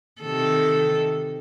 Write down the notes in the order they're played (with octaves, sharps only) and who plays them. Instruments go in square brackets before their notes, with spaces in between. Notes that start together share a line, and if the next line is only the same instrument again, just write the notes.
[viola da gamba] C3 D#3 A4